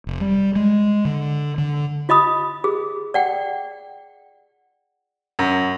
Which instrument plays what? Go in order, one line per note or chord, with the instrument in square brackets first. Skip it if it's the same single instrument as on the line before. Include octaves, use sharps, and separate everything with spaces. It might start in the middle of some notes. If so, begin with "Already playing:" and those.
[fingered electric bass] F1
G3
G#3
D3
D3
[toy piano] F4 D#5 B5 D#6
G#4
D5 F#5 G5
[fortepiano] F#2